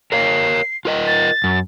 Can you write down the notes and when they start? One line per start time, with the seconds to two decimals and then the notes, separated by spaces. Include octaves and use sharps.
0.12 A#4 C#5 F5 C7
0.85 F4 A#4 D#5
1.07 A6
1.44 F#2